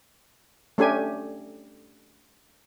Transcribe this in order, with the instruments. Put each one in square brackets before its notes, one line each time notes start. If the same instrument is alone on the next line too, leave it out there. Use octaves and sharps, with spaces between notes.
[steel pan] A3 C#4 D4 G4 A4 G#5